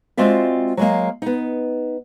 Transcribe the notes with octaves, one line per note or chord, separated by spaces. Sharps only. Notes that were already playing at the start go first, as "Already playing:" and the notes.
G#3 C4 F4 F#4 D5 E5
F#3 G#3 A#3
B3 D#4